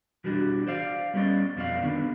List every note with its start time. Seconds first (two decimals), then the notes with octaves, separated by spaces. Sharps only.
0.24 B2 E3 G3 D4 F#4
0.67 C5 D5 F5
1.14 G3 A3 B3 C#4 D5 D#5
1.56 F2 B2 F3 E4 D5 F5
1.83 D3 D#3 B3